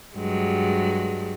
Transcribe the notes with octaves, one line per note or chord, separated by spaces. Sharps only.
G2 F#3 G#3